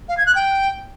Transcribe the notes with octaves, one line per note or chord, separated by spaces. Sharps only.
F5
G#6
F#6
G5